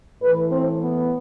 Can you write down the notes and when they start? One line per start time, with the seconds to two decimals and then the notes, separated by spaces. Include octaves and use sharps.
0.22 A2 E3 B4
0.51 C4
0.79 B3